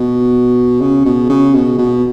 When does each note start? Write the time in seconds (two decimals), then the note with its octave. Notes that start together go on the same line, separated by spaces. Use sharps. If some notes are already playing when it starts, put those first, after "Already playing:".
Already playing: B2
0.81 C#3
1.05 B2
1.29 C#3
1.54 B2
1.79 B2